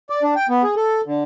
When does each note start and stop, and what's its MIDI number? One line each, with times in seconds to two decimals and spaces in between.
0.10 0.22 74
0.23 0.34 62
0.36 0.47 79
0.49 0.62 59
0.63 0.75 68
0.76 1.01 69
1.06 1.23 50